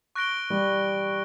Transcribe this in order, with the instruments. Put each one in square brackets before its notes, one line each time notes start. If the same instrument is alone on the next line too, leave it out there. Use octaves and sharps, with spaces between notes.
[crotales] C#6 F#6 A#6 D7 G7
[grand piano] G3